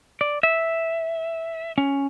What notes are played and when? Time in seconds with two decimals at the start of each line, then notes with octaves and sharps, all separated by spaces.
0.21 D5
0.43 E5
1.78 C#4